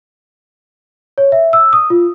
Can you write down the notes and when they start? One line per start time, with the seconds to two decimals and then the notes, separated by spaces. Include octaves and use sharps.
1.18 C#5
1.32 E5
1.53 E6
1.73 D#6
1.90 F4